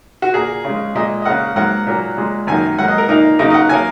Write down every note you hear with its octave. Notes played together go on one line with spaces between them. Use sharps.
F#4
A#2 A#3 G#4
C#3 G#3
A#2 G#3 D#5
D#5
C#3 A#3 F#5
G#2 F#3 A#3 F#5
A#2 F#3 A#3
A#2 G#3
F#2 D#3 F#3 A#3 G#5
G#2 F#3 A#3 F#5
D#5
A#4
A#2 A#3 D#4
C#3 F#3 A#3 D#4
D#5
F#5
F#3 A#3 G#5